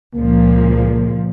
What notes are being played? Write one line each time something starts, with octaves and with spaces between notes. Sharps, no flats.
C#2 A#2 F3 A#3